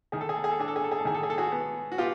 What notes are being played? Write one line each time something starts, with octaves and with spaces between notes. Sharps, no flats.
D#3 G#4
A4
G#4
A4
G#4
A4
D4 G#4
A4
G#4
A4
G#4
A4
D#3 G#4
A4
G#4
A4
F#4 G#4
B3
F#4
B3 F4 G4